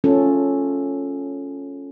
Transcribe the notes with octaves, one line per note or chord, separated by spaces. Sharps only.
C#4 F4 A4